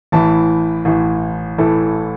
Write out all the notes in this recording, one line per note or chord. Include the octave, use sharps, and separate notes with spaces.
A1 A2 E3 A5
A1 A2 E3
A2 E3 A4